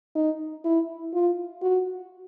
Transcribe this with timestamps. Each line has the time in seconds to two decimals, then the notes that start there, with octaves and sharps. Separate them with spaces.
0.16 D#4
0.65 E4
1.14 F4
1.62 F#4